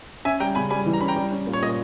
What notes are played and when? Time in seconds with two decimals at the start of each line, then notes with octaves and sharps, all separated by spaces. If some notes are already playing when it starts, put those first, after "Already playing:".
0.25 C#4 E5 G#5
0.40 G3 G5 A#5
0.55 C#3 G#5 B5
0.70 G3 G#5 B5
0.86 E3
0.93 A#5
1.01 C#4 B5
1.08 G5 A#5
1.16 G3
1.31 C#4
1.47 A#2
1.53 C#5
1.62 A#2 D#5